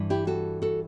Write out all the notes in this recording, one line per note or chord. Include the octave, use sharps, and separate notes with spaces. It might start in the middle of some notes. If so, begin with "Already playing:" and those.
Already playing: G2 E3
E4 G4
F#4 A4
F#4 A4